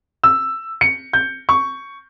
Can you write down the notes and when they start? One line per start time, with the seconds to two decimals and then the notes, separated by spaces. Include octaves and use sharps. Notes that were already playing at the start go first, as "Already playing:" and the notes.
0.24 E6
0.81 C#7
1.13 G6
1.49 C#6